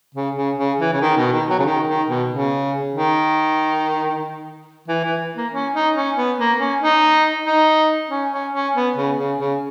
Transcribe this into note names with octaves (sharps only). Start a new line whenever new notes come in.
C#3
C#3
C#3
E3
C#3
D#3
B2
D#3
F#3
C#3
D#3
D#3
B2
C#3
D#3
E3
E3
A#3
C#4
D#4
C#4
B3
A#3
C#4
D#4
D#4
C#4
C#4
C#4
B3
C#3
C#3
C#3